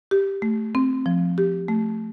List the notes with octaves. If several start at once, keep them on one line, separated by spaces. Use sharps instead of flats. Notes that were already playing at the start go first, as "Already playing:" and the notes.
G4
A3
C4
F3
G4
A3